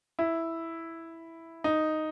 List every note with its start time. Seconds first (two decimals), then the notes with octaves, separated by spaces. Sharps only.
0.19 E4
1.64 D#4